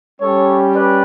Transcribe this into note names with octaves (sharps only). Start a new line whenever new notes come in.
G3 C#4 G4 A4 C#5
B4 D5